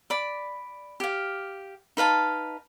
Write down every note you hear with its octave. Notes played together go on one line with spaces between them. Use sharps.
D5 B5
G4 F5
D#4 B4 F5 A5